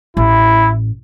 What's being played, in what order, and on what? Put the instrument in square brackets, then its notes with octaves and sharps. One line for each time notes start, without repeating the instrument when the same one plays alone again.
[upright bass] A1 [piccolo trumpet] E4